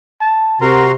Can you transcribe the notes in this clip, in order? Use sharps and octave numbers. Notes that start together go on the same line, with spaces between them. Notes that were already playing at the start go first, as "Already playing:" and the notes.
A5
C3 F#4 A#4 A#5 C6